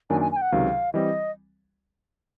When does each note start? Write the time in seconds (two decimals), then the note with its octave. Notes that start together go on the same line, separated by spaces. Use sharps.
0.10 F#2 D#3 F#3 A#3 D4 G#5
0.21 G#5
0.32 G#5
0.37 G5
0.42 F#5
0.52 C#2 C3 D#3 F#3 F5
0.94 E3 G3 C4 D#5